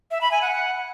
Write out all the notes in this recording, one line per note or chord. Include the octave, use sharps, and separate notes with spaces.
E5
B5
G#5
F#5
F#5